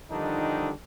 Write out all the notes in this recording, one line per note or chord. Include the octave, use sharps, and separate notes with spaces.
D3 D#3 F3 G3 D4 D#4